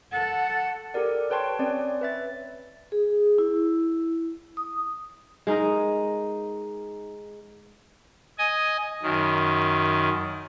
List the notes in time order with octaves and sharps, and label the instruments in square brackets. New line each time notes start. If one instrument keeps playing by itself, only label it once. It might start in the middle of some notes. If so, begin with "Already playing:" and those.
[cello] A4 [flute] F#5
[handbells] G4 A4 A#4 D5
B4 C#5 G5 A5 C6 C#6
C4 C#4 C#5 D5
B4 E5 A6
[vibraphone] G#4
E4
D#6
[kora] G#3 D#4 A#4 D#5
[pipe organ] D#5 G#5
F#2 D#3